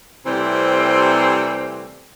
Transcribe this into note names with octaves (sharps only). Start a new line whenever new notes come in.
C3 E3 G3 A3 C4